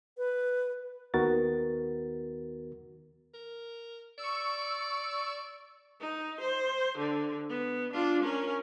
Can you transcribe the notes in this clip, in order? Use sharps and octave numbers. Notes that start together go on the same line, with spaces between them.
B4
D#2 D#3 B3 F#4 A#4 A6
A#4
D5 C#6 E6
D#4
C5
D3
B3
D4 F4
C#4 A#4